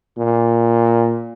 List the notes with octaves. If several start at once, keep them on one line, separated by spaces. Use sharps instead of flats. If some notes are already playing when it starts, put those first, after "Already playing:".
A#2